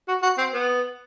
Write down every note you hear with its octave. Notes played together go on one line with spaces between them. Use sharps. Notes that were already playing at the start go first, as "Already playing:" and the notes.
F#4
F#4
C4
B3